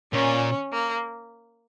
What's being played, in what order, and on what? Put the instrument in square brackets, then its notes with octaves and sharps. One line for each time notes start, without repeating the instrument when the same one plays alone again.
[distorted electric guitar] A#2 [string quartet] C#4
[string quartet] A#3